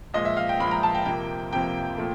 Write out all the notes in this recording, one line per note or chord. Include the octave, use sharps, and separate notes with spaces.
A#2 F3 G#3 D#5
E5
F5
G5
A#2 F3 G#3 B5
A#5
A5
G5
F2 C3 F3 A#3 G5
F2 C3 F3 A#3 G5
A#2 F3 A3